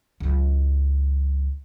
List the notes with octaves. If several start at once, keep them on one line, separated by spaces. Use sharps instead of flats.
C#2 F#3